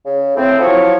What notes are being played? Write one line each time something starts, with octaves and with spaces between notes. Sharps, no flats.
C#3
A2 C4
F3 F#3 E4 C#5